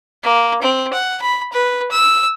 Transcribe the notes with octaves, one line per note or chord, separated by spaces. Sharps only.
A#3
C4
F#5
B5
B4
E6